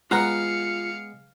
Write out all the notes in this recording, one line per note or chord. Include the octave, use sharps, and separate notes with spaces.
G#3 B3 F4 F5 F#5 A#5 C#7